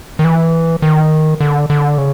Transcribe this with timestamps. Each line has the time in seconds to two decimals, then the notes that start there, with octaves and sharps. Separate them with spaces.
0.19 D#3
0.24 E3
0.82 D#3
1.40 D3
1.70 D3
1.98 C#3